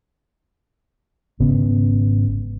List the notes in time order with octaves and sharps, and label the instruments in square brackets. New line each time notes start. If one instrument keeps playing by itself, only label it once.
[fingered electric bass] G#1 C#3 B3 C#4